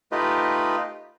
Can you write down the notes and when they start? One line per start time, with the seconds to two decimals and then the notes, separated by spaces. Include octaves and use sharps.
0.12 A3 D#4 F4 G4 B4 D#5